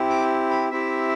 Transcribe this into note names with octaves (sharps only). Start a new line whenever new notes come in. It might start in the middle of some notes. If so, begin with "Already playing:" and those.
Already playing: C4 E4 G4
D6
B5
C4 E4 G4 E5